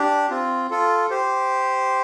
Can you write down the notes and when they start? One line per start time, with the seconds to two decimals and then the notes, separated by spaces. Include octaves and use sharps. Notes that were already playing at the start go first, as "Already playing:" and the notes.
Already playing: D4 G4
0.31 C4 F4
0.71 F4 A4
1.10 G4 C5